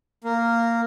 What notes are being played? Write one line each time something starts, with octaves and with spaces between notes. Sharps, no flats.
A#3